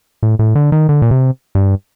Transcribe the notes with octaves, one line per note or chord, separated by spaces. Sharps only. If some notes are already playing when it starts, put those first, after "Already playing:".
A2
A2
D3
D#3
D3
A#2
C3
G2